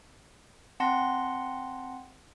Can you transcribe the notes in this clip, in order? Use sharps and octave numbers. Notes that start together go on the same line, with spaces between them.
C4 F#5 A5 C6 A#6